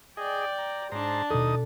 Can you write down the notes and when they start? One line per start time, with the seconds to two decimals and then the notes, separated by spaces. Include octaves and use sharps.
0.17 G#4 D5 D#5 G5
0.58 A#5
0.92 G#2 D4 C5 A5 A#5
1.30 D#2 B2 D#4 A4 D#6